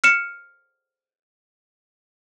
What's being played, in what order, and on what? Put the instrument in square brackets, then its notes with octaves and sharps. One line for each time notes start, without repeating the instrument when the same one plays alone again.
[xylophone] F6 C#7 E7